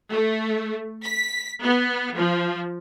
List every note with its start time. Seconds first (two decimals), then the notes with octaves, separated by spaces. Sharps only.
0.11 A3
1.04 B6
1.63 B3
2.15 F3